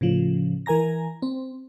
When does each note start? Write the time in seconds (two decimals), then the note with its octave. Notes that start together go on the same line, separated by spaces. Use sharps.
0.01 A2 C#3 F3
0.66 E3 A#4 G#5 A#5 A#6
1.22 C4